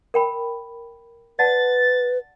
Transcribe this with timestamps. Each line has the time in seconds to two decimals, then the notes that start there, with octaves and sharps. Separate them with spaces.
0.14 A#4 G5 B5
1.39 B4 D5 F#5 A5 A6